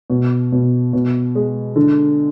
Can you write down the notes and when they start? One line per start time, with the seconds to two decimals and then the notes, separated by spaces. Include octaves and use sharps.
0.10 B2
0.52 B2
0.93 B2
1.35 G#3
1.76 D3